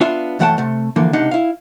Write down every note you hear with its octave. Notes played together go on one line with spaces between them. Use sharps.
B3 D4 F4 E5
F#2 E3 A3 F#5 G5 A5
C3 A3
D3 E3 F3 A#3
C#2 C3 D4 D#4 F#5
E4 F5